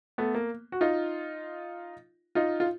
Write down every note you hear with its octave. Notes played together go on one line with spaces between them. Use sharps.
A3 B3
A#3
F#4
D#4 F4
D#4 F4
F4